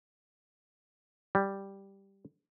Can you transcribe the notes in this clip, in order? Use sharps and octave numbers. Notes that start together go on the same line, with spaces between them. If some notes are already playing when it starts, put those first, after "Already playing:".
G3